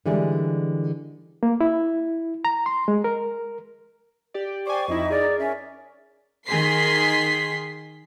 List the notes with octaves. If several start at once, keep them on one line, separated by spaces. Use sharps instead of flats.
D3 E3 G3 G#3
A#3
E4
A#5
C6
G#3
A#4
G4 D5
C5 D5 G5 G#5 C#6 D6
F2 D#4 E4 D#5
G#4 A#4 D5
C#4 E5
D#3 G#4 C6 B6 C7